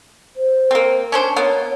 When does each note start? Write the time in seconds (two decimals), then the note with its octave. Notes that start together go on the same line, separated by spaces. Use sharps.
0.36 C5
0.71 A#3 C4
1.12 C#4 D4 C5
1.36 A#3 B3 C#5